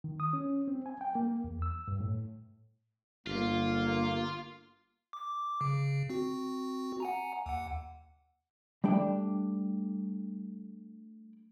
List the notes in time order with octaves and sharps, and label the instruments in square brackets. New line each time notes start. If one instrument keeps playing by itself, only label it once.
[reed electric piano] D#3
D#6
C#4
C4
G#5
G5
A#3
E2
E6
G2
A2
[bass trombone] G1 [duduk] A#3 [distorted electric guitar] F4
[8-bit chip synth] D6
C#3
C4 F#4
F#5 G#5 A#5
D#2 F#5
[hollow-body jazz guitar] G3 A3 D4 G5